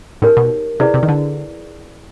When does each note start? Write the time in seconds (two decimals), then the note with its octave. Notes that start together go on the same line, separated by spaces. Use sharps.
0.22 A2 D#4 G4 A#4 C#5
0.37 B2
0.80 C3 E4 G#4 B4 D5
0.94 C3
1.03 D#3
1.09 D3